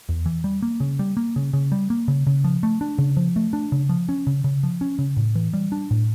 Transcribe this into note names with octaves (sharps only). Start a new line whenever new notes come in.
E2
E3
G3
A#3
C#3
G3
A#3
C#3
C#3
G3
A#3
C#3
C#3
F3
A3
D4
C#3
F3
A3
D4
C#3
F3
C#4
C#3
C#3
F3
C#4
C#3
A2
E3
G3
D4
A2